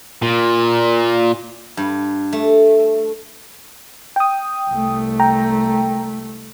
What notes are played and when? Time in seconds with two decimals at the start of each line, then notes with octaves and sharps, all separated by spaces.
0.22 A#2
1.77 G2
2.33 A3
4.16 G5 D#6
4.70 C2 A3
5.20 G5 A#5